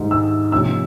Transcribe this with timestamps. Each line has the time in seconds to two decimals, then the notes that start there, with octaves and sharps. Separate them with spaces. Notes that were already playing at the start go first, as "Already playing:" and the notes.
Already playing: G#2 D#3 G3
0.11 E6
0.52 C3 F3 A#3 C#4 E6